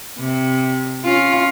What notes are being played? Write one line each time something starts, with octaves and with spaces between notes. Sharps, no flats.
C3
C#4 F4